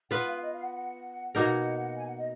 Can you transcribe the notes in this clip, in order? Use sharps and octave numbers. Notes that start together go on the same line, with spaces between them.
B3 F4 B4 F#5
F5
D#5
F5
F#5
F#5
B2 A#3 D#4 A#4 F#5
G#5
F#5
D#5